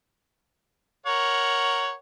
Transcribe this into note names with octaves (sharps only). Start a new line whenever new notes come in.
A#4 C#5 F#5